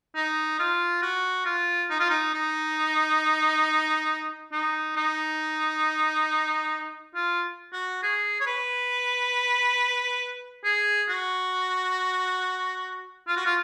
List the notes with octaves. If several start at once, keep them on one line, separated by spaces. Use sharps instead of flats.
D#4
F4
F#4
F4
D#4
F4
D#4
D#4
D#4
D#4
F4
F#4
G#4
C#5
B4
G#4
F#4
F4
F#4
F4